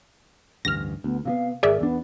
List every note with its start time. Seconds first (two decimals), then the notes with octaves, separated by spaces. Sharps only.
0.65 A1 D2 G2 F6 A#6
1.04 D2 B3
1.25 C3 F3 B3 F5
1.63 G#1 G#4 A#4 D5 E5
1.80 E2 B3 D4